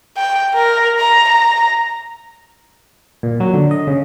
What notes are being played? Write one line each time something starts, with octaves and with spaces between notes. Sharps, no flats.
G5
A#4
A#5
A#5
A#2
F#3
D3
D#5
C#3